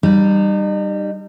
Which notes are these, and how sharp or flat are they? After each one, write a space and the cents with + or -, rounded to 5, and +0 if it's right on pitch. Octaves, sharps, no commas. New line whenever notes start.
G3 -5 D#4 -40